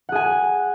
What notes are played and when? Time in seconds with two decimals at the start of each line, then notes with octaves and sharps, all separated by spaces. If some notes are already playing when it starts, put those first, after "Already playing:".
0.09 F#5
0.12 G#4
0.15 G#5